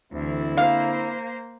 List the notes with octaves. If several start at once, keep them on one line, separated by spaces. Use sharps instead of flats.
D2 D3 E3 C4 E4
A#3 C5 F5